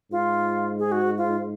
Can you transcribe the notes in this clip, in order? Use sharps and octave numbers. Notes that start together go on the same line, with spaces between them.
G#2 F4
G#4
F#4
F4